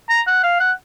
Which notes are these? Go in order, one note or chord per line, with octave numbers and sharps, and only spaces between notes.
A#5
F#5
F5
F#5